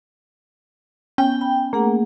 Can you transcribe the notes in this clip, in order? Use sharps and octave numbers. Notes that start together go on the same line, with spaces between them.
B3 C#4 G5
B5
A3 A#3 G#4 F#5